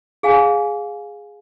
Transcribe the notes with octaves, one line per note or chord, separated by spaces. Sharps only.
G#4 F5 G#5